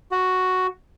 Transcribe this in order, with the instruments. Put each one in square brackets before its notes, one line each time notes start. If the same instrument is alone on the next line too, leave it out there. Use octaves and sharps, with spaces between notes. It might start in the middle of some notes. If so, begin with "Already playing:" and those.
[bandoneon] F#4